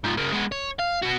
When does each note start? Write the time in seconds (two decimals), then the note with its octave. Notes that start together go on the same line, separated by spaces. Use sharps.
0.04 G#2 F3
0.17 C#3 A#3
0.32 G#3 B3
0.52 C#5
0.79 F5
1.02 B2 F#4